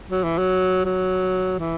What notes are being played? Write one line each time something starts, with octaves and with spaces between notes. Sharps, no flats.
F#3
E3
F#3
F#3
E3